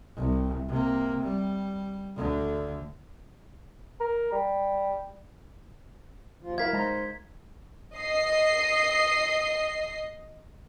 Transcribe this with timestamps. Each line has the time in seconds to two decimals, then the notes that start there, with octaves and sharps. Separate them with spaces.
0.16 C2
0.69 C3 A#3
1.22 G3
2.16 D2 D3
4.00 A#4
4.32 G3
6.43 D#2 F3 F4
6.58 F#3 E4 A#4 F5 G#6 B6
6.73 G#3 D#4 C5 A#5 B5
7.97 D#5 C7